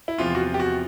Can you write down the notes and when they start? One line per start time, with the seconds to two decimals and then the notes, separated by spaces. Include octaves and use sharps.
0.08 E4
0.18 E2 C3 F3 F4
0.35 F#4
0.40 F4
0.54 G4
0.60 F#4